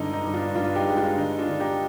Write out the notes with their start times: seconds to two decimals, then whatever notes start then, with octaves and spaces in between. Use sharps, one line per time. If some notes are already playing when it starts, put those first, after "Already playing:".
Already playing: G2 D3 G#3 D#4
0.13 D#4
0.23 G2
0.34 D4 F4
0.55 G2 D4 F4
0.76 D#4 G4
0.87 G#3
0.97 D4 F4
1.18 D3 D#4
1.39 D4 F4
1.49 D3
1.60 D#4 G4